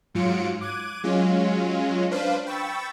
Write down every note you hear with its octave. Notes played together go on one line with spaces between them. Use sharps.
G#2 F#3 F4 C#7 D7
D6 F#6 G#6 D#7
F#3 G#3 C#4 F4
D4 B4 C5 F5
G5 B5 C#6 E6 A6